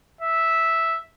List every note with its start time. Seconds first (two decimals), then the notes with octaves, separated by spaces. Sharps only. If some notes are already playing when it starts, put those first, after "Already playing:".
0.21 E5